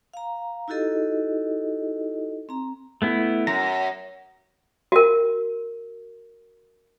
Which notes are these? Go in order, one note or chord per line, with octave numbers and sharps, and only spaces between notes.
F5 A#5
D#4 E4 F#4 G4 A4 D#5
C4 A#5
A3 B3 E4
F#2 A#5
F#4 A#4